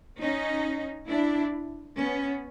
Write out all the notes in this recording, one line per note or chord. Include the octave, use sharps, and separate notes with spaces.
C#4 D#4
D4 E4
B3 C#4